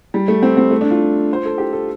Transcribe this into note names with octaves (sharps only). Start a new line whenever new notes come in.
G3
A3
C4
C4
A3
D4
F4
C5
A4
G4
A4